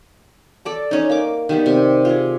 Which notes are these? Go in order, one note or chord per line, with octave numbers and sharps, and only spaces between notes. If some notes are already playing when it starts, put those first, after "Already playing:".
A4 D5 A5
C#4 D#4
A#3 D6
D#3 G3 B3
C3
F4 G#4